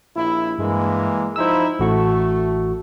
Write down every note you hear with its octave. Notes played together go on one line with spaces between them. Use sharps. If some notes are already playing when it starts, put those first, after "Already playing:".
A#1 E4
G2 E3 G#3 A#3
F3 D#4 E4 C5 B5 E6
A1 A3 F#4 C#6